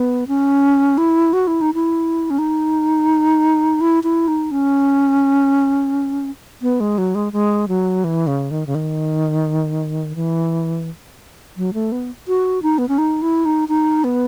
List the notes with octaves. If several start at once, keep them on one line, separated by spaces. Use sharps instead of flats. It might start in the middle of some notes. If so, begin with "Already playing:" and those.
Already playing: B3
C#4
E4
F#4
E4
D#4
E4
C#4
D#4
E4
E4
D#4
C#4
B3
G#3
F#3
G#3
G#3
F#3
E3
C#3
D#3
C#3
D#3
E3
F#3
A3
B3
F#4
D#4
B3
C#4
D#4
E4
D#4
D#4
B3